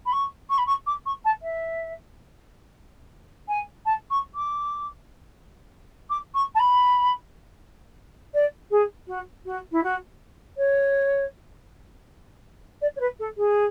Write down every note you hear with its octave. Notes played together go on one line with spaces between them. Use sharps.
B5
C#6
C#6
B5
C#6
D6
C#6
A5
E5
G#5
A5
C#6
D6
D6
C#6
A5
B5
D5
G#4
F#4
F#4
E4
F#4
C#5
D5
C#5
B4
A4
G#4